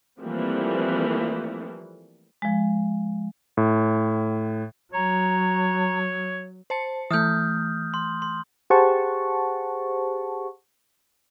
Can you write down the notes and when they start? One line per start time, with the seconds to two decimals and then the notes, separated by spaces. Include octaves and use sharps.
0.20 E3 F3 G3 A3 A#3 C4
2.42 F3 G#3
3.57 A2
4.93 F#3 C#5 A#5
6.70 C5 A5 C#7
7.11 E3 A3 D#6 F6 G6
7.94 C6
8.22 C6
8.70 G4 G#4 C5 F#5 A5 C#6